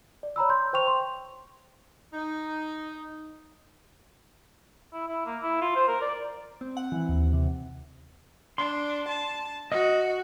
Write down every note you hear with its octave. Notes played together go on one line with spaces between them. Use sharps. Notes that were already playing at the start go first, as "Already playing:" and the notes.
D5
C#5 A#5 B5 E6
C6 G6
C5 G5 C#6 F7
C6
D#4
E4
E4
A#3
E4
F4
C5
A#4
D5
C4
F#5
E3
D#2
C3
D4 C6
A5
F#4 D#5